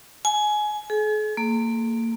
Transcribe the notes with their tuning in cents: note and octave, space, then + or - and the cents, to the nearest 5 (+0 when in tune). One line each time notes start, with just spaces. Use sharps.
G#5 +20
G#4 +45
A#3 -30